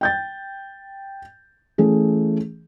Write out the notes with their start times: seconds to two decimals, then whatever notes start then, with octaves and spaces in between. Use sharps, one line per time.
0.01 G5 G6 A6
1.78 E3 A3 C#4 G#4